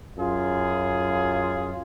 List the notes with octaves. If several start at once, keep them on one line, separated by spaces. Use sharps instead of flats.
F#2 F4 G#4